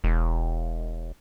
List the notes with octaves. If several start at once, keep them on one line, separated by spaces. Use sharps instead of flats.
E1